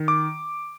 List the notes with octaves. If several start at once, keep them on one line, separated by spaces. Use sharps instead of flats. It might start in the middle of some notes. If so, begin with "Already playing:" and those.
Already playing: D#3
D6